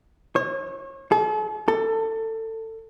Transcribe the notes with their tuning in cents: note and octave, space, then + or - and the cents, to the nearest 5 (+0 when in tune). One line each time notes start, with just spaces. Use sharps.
C#5 -35
A4 -45
A4 +25